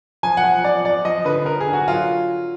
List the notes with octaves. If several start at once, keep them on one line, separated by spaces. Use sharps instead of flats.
F3 G#5
F#5
F3
F3 D5
F3 D5
F3 D#5
D3 B4
D3 A#4
G#4
D3
F#4
F#3 F4